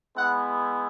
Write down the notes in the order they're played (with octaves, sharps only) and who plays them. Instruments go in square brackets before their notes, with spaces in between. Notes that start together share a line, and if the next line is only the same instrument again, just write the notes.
[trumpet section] G#3 B3 E4 F#5